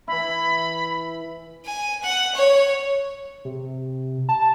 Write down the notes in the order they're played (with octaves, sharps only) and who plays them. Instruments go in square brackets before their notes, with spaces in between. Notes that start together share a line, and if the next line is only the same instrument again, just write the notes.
[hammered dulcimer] E3 E4 [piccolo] B5
[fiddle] G#5
F#5
C#5
[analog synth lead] C3
A5